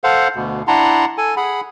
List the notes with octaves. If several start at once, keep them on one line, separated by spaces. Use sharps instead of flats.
A4 C5 F5 F#5
D2 B2
D4 E4 F#5 A5 A#5 C6
A4 G#5
G#4 F#5 B5